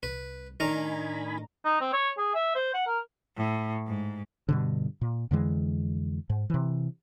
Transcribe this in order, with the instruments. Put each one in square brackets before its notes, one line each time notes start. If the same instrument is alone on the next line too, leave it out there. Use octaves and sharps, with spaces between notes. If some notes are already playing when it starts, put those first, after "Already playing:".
[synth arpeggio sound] C2 [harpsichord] B4
[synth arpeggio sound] A2 D4 A#5 [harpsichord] D#3 A#4 [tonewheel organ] D#4 G#5 B5
[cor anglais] D#4
C4
C#5
G#4
E5
C5
F#5
A#4
[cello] A2
G#2
[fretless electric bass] G2 B2 D3
A#2
F2 D3 E3 G#3
G#2
C3 E3